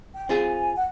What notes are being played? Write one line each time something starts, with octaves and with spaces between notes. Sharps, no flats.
G5
C4 F4 G#4 G#5
F#5